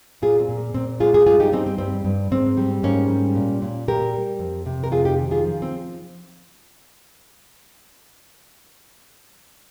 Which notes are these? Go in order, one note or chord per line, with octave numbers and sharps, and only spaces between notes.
A#2 F4 G#4
C4
A#2
A#3
A#2 C4
G#3 F4 G#4
F4 G#4
G2 F4 G#4
D#4 G4
G3 C4 D#4
C4
G2 C4
G2
G#2 C4
G3
G#2 A#3 C#4
G3
A#2
A#2
A#2 G4 A#4
G3
F2
C3
A#4
F2 F4 G#4
D#4 G4
D#3
F4 G#4
F3
C4